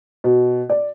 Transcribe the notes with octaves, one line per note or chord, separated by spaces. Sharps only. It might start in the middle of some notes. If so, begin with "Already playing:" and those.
B2
D5